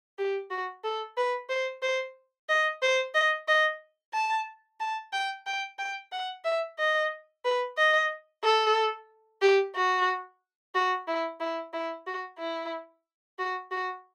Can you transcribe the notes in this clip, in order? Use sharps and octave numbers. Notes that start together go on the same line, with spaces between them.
G4
F#4
A4
B4
C5
C5
D#5
C5
D#5
D#5
A5
A5
G5
G5
G5
F#5
E5
D#5
B4
D#5
A4
G4
F#4
F#4
E4
E4
E4
F#4
E4
F#4
F#4